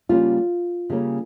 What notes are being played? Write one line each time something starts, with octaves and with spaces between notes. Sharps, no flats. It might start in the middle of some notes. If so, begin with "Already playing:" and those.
C#3 G3 A#3 C#4 F4
C#3 G3 A#3 C#4